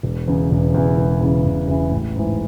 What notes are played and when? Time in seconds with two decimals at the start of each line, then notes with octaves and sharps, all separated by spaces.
0.03 E1
0.28 E2 C#3 E3
0.51 E1
0.74 E2 C#3 E3
0.97 E1
1.21 E2 C#3 E3
1.45 E1
1.68 E2 C#3 E3
1.92 A1
2.16 G#2 E3